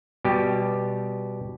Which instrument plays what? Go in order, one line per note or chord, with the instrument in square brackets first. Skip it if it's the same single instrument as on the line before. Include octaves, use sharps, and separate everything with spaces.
[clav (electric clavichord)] B2 G3 G4